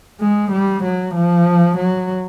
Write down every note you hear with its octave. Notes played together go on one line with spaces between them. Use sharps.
G#3
G3
F#3
F3
F#3